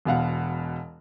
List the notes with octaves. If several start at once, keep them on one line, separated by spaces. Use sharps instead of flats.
E1 B2 F5 F#5